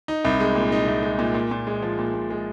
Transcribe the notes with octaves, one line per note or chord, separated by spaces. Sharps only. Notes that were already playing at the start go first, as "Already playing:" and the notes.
D#4
C2
G#3
A#2
D#4
C2
G#3
A#2
A#2
A#2
G#3
F3
A#2
A#2
G#3